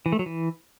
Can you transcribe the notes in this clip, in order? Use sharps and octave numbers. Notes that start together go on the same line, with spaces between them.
E3
A3
F#3
E3